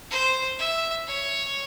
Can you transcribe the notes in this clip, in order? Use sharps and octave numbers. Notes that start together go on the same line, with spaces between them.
C5
E5
C#5